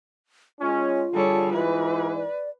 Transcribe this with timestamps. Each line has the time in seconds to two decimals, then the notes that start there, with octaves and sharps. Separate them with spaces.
0.60 G#3 C#4 F4
1.14 D3 G3 G#4 A4 C#5
1.53 G#2 E3 B4
2.14 D5